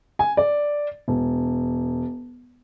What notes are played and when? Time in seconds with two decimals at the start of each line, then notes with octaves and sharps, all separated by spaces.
0.19 G#5
0.37 D5
1.08 E1